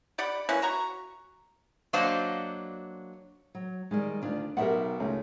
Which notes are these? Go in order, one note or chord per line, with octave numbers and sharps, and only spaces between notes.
G4 D5 F#5 B5
A#3 C#4 E4 B4
F#4 A#5 C#6
F#3 A#3 D4 C5 D#5 F5
F#3
D#3 G3 G#3
D2 D4 F4
B1 D#4 G4 A#4 E5 F#5
C#2 A3 C#4